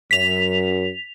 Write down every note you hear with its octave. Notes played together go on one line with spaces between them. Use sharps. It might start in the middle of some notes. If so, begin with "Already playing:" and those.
F#2 B6 F7